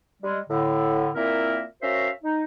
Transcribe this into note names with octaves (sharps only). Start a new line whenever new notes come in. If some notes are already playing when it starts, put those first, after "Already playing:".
G3 G#3
A2 D3
A#2 A#3 C4 E4 A#4 E5
C#4 F#4 A#4 C5 E5 F5
D#4